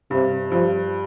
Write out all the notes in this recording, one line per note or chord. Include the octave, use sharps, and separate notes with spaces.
G2 C3
G2 F3